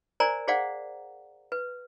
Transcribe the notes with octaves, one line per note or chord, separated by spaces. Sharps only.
A#4 C5 D5 G#5 A#5
G#4 C5 D5 F5 F#5
B4